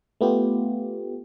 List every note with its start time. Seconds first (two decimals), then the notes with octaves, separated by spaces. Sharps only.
0.21 A3 B3 F4 G4